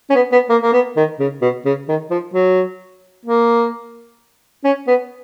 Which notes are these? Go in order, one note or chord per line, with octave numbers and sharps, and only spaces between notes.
C#4
B3
B3
A#3
A#3
B3
D#3
C#3
B2
C#3
D#3
F3
F#3
A#3
C#4
B3